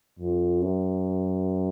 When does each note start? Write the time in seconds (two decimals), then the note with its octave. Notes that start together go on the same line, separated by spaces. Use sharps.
0.19 F2
0.62 F#2